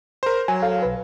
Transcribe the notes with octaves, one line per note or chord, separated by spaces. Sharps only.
A#4 C5
F#3 G#5
A4 F5
B1 B4